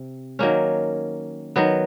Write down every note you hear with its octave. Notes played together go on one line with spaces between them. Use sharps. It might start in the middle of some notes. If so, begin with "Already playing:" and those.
Already playing: C3
D#3 F#3 A#3 C#4
D#3 F#3 B3